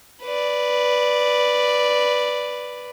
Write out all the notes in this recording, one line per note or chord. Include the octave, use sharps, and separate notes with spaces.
B4 D5